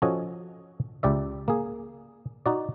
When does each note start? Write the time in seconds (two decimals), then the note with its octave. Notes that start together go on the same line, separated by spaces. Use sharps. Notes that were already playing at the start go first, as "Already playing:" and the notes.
0.02 F3 C#4 F#4 A4 D#5 G#5
1.03 C#2 G4 D5 E5
1.48 A#3 G#4
2.46 D#4 F#4 D5